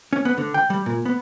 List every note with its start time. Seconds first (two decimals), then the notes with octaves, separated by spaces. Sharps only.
0.13 C#4
0.25 B3
0.38 D3
0.54 G5
0.70 G3
0.86 A#2
1.05 B3